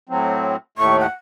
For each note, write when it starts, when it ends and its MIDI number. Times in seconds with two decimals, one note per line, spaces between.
0.09 0.56 45
0.09 0.56 54
0.09 0.56 60
0.78 1.07 39
0.78 1.07 45
0.78 1.07 57
0.78 1.00 85
1.00 1.12 78